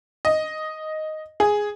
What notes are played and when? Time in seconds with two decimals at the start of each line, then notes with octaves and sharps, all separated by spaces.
0.25 D#5
1.40 G#4